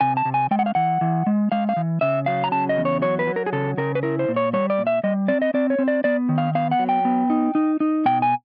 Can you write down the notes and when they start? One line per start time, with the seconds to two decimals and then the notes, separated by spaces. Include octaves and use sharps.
0.01 C3 G#5
0.17 A5
0.25 C3
0.34 G#5
0.51 G#3 G5
0.59 F#5
0.66 F5
0.75 E3 F#5
1.01 E3
1.27 G#3
1.52 G#3 F5
1.69 F5
1.76 E3
2.01 C#3 E5
2.26 F#3 F5
2.44 A#5
2.52 C#3 A5
2.69 D#5
2.77 E2
2.85 C#5
3.02 F#3 C#5
3.19 B4
3.27 F#3
3.36 A#4
3.46 G#4
3.53 C#3 A4
3.77 C#3 A#4
3.95 B4
4.03 E4 A#4
4.19 C5
4.29 A#2
4.36 C#5
4.53 G3 C#5
4.70 D5
4.78 A#2
4.87 E5
5.04 G3 D#5
5.28 C4 D5
5.42 D#5
5.54 C4 D5
5.70 C#5
5.79 C4
5.88 D5
6.04 B3 D5
6.29 D#3
6.38 F5
6.55 B3 F5
6.71 F#5
6.79 F#3
6.89 G5
7.05 B3
7.30 D#4
7.55 D#4
7.80 D#4
8.06 B2 G5
8.22 G#5